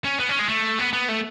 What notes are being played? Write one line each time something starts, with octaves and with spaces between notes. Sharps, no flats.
C#4
B3
C#4
G#3
A3
B3
B3
A3